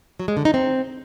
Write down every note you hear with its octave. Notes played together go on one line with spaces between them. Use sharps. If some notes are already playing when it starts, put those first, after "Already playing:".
F#3
G#3
D3
D#4
C4